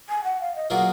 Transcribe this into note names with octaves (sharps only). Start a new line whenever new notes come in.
G#5
F#5
F5
D#5
B2 F#3 A#3 F4 G#4 F#5